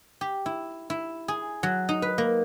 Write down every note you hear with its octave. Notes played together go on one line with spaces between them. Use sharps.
G4
E4
E4
G#4
F#3
D#4
B4
A#3